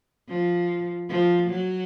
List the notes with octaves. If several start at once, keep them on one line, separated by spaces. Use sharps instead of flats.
F3
F3
F#3